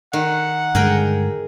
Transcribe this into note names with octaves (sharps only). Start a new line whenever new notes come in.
D#3 F#5
G2 D3 G#3 G#4 A#4 G5